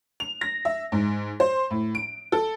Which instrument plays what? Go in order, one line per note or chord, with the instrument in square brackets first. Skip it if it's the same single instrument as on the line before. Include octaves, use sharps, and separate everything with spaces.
[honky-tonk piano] F7
A#6
E5
G#2
C5
A2
D7
A4